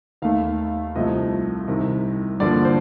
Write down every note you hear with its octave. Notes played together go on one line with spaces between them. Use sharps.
D#2 D#3 A3 F5
C2 C3 F3 A3 D#5
C2 C3 D#3
G2 D3 F3 A#3 D5
C5